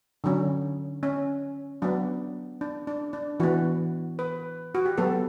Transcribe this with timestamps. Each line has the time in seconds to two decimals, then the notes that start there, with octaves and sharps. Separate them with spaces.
0.24 D3 F#3 C#4
1.03 C#4
1.82 F#3 B3 D4
2.61 D4
2.87 D4
3.13 D4
3.40 E3 B3 F#4
4.19 B4
4.75 F#4
4.86 G4
4.98 F#3 B3 A4